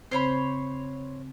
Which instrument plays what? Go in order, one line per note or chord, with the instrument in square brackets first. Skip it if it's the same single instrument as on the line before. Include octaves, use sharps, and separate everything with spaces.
[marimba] C#3 C4 [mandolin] C5 C#5 B5